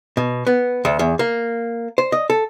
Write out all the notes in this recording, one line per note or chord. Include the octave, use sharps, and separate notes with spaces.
B2
B3
D2
E2
A#3
C5
D#5
A4